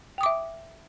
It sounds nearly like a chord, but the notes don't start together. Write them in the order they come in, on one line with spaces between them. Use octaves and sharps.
G5 D#6 D6 E5